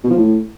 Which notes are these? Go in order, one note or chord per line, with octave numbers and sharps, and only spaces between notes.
B2
F3
A2